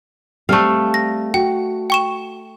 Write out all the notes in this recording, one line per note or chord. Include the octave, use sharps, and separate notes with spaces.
G3 A3 C4 A4 F5
A#6
F#4 G5
G5 C#6 E7